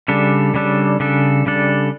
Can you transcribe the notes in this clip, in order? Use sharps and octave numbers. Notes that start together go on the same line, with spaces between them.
C#3 G3 D4 A4
C#3 G3 D4 A4
C#3 G3 D4 A4
C#3 G3 D4 A4